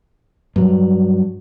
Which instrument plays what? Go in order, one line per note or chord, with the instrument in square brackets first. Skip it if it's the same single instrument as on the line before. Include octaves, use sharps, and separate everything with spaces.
[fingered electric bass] G2 F#3